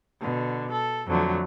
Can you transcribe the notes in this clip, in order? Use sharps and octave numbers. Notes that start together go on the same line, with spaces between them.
B2 D3
A4
F2 D3 F#3 A3